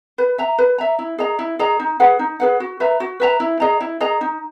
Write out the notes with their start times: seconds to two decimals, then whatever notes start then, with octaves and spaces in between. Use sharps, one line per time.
0.18 B4
0.38 E5 A#5
0.58 B4
0.78 E5 A#5
0.99 E4
1.18 G#4 D#5 A#5
1.39 E4
1.59 G#4 D#5 A#5
1.79 D#4
2.00 G#4 B4 F#5
2.19 D#4
2.40 G#4 B4 F#5
2.60 F#4
2.80 B4 E5 A#5
3.00 F#4
3.20 B4 E5 A#5
3.40 E4
3.60 G#4 D#5 A#5
3.80 E4
4.00 G#4 D#5 A#5
4.21 D#4